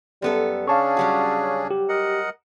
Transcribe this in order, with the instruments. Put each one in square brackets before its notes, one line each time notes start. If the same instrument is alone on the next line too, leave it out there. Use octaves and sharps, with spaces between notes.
[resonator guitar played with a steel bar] F#2 B3 A4 [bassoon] G3
[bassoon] C#3 [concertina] C#4 D4 G#4 [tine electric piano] F5 A5 C#6
[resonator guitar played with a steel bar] F#3 G3 F#4
[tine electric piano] G4
[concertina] A#4 D#5 F#5